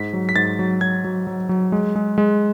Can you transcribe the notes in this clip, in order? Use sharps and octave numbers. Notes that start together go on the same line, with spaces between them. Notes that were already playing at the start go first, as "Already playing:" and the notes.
Already playing: G#2 B6
F#3
B6
G#2 A6
F#3
F#3 G#6
F#3
F#3
F#3
G#3
G#3
G#3